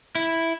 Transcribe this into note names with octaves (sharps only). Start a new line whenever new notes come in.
E4